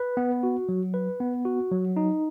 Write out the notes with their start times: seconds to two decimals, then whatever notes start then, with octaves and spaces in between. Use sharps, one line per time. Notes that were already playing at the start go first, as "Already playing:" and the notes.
Already playing: B4
0.17 B3
0.43 F#4
0.69 F#3
0.94 B4
1.20 B3
1.45 F#4
1.71 F#3
1.96 D#4